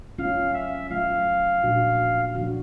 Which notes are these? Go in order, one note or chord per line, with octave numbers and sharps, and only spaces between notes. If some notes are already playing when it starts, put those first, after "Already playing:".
F#3 A3 C#4 F4 F5
E5
F#3 A3 C#4 F4 F5
A#2 F3 A3 D4 F#4
A#2 F3 A3 D4 F#4